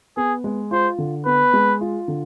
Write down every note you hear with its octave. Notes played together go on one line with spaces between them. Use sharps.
B3 G#4
G#3
F4 C5
D3
B3 B4
G#3
F4
D3